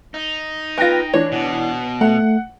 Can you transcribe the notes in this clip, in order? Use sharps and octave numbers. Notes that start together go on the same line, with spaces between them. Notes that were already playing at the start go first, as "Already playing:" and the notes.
D#4
B3 F4 G5 A#6
E3 D4 C#5
B2
A3 F#5